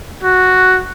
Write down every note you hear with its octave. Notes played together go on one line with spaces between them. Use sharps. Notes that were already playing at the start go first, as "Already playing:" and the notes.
F#4